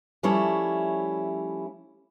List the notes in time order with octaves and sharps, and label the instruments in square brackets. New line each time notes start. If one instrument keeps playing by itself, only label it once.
[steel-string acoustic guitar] F3 G3 A3 C#4 E4 C#5